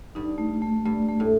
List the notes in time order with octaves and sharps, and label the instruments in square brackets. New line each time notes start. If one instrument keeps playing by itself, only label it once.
[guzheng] G2 [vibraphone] D#4
[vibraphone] A3
A3
[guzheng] G2 [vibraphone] A3
[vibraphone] A3
[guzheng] A2